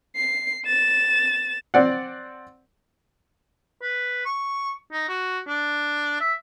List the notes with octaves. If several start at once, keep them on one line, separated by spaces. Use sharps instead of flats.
C7
A6 E7
C4 D5 F#5
B4
C#6
D#4
F#4
D4
E5